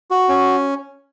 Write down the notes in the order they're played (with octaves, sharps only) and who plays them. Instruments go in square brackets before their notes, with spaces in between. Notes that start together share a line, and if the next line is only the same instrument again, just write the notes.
[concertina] F#4
C#4